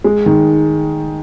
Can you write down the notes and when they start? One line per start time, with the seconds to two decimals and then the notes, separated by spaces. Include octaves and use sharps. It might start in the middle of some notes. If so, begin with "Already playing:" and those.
0.04 G#3
0.26 D#3